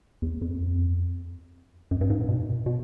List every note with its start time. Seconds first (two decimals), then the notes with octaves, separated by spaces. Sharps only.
0.22 E2
0.41 F2
1.91 F#2
2.01 G2
2.10 G#2
2.20 A2
2.29 B2
2.66 B2